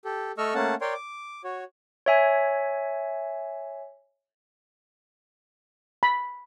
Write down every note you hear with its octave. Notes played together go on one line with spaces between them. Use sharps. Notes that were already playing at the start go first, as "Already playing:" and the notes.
G4 A4
A3 A4 D#5 C#6 E6 F6
A3 A#3 C#4 F#5 A5
A#4 C#5 D5 G5 C6
D6
F#4 C#5
C#5 E5 G#5
B5